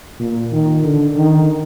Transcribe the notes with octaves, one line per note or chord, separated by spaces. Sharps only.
A#2
D#3
D3
D#3